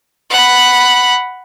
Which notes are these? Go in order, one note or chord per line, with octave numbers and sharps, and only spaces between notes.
F#5 B5